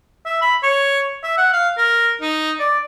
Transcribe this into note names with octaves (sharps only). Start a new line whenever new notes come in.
E5
B5
C#5
E5
F#5
F5
A#4
D#4
D5